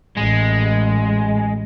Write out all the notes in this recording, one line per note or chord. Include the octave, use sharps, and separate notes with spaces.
A1 G#3